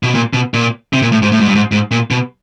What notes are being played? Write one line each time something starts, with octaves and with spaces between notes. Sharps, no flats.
B2
A#2
B2
A#2
C3
A#2
A2
G#2
A2
G#2
G2
G#2
G#2
A#2
B2